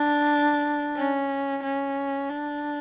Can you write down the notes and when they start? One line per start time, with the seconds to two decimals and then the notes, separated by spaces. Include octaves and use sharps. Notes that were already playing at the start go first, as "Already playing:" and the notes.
Already playing: D4
0.96 C#4
1.63 C#4
2.29 D4